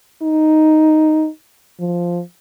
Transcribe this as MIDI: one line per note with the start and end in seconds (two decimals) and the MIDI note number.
0.23 1.28 63
1.80 2.21 53